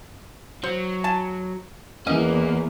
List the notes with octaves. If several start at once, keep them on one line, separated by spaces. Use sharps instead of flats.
F#3 C5
G#5 A5
E2 E3 A#3 C#4 D#5